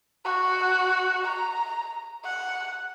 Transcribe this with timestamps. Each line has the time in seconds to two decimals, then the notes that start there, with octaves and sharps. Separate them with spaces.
0.25 F#4
1.27 A#5
2.25 F#5